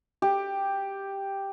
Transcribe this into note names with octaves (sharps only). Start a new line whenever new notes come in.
G4